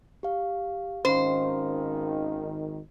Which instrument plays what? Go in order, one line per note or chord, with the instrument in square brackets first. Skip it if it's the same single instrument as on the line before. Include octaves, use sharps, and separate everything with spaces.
[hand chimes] G4 F5
[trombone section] G#1 D#3 [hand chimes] C#4 F5 [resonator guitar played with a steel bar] C5